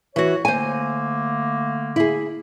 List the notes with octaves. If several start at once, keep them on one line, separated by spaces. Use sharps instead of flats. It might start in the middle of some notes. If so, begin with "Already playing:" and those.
E3 F#4 C#5
D3 A3 A#3 C5 G#5
E4 G#4